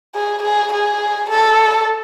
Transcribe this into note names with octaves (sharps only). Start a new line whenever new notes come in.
G#4
G#4
G#4
A4